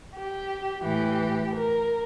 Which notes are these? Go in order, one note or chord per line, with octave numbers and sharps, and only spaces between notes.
G4
A2 E3 G4
A#4